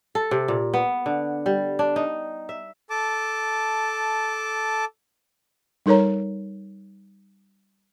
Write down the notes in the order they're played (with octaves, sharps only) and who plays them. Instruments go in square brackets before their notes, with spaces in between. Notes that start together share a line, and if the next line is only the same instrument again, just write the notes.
[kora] A4
C3
A#2
B3
D3
G3
D4
D#4
E5
[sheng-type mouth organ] A4 A5 D6
[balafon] G3 D#4 A4 A#4 C#5 A#5